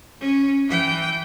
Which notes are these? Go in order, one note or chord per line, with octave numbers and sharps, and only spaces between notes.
C#4
E3 G5